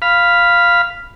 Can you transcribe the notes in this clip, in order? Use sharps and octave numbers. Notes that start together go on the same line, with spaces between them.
F5 B5